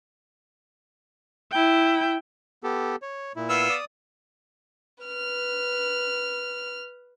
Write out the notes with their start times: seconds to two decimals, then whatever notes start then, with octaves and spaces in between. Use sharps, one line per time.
1.51 E4 G5
2.64 B3 G4 A4
3.02 C#5
3.36 A#2 E4
3.49 B3 F5 E6
3.69 D5 D#6
5.04 B4 F6